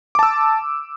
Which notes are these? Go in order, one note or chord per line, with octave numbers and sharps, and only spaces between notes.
A5 D6 E6